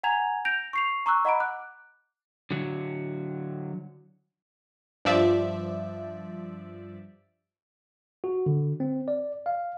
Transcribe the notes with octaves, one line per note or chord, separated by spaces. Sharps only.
F#5 G#5 A#5 G#6 F7
G6 A#6 D7 F7
C#6 C7 F7
A#5 C#6 D6 E6 F#6
D#5 F#5 A#5 B5 D7
D6 F#6
D3 F#3
G2 F3 D5 E5
F#4
D3
C4
D5
F5